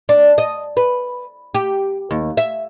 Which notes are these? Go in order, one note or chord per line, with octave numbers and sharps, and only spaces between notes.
D4
D#5
B4
G4
D#2
E5